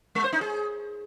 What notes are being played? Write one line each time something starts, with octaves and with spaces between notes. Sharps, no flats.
G#3
C5
D#4
G#4